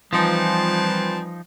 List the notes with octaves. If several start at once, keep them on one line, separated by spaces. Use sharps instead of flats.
E3 F3 G3 C4 D#4 F4 A5